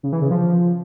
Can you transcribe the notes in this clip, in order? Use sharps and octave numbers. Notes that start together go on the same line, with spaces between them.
C#3
E3
C#3
F3